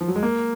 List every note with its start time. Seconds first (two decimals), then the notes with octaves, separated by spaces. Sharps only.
0.01 F3
0.08 F#3
0.16 G#3
0.23 A#3